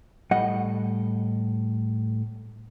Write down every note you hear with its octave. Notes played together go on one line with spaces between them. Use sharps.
A2 G3 D#5 F#5